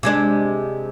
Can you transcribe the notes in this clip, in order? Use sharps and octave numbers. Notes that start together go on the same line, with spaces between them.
C3 G#3 D4